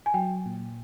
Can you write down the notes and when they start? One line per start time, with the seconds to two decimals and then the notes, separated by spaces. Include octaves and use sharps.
0.06 G#5
0.14 F#3 G5
0.46 A#2